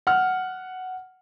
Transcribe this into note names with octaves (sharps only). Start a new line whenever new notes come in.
F#5 F6